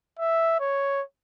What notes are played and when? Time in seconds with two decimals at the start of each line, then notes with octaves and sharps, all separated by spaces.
0.20 E5
0.60 C#5